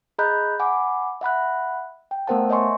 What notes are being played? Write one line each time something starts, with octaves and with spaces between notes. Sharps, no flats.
G#4 D#5 A#5 B5 F#6 G6
F#5 G#5 B5 D6
E5 F#5 B5 F#6
G5
A3 B3 A#4 C5 F#5 A5
C#5 D#5 E5 G#5 C6 C#6